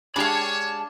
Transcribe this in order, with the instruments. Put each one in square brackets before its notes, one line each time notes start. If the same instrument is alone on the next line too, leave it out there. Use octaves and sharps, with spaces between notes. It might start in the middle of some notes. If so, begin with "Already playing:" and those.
[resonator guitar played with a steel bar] G#3 G4 G#4 [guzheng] D4 F5 [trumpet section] C#5 [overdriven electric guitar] A5 B5